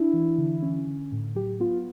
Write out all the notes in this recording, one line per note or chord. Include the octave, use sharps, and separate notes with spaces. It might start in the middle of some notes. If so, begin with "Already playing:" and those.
Already playing: D4 E4
E3
D3
C#4
D3
A2
F#3 G4
B3 F4